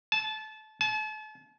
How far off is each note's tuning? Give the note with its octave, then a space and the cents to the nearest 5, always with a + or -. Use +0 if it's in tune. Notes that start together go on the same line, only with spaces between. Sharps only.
A5 -25
A5 -40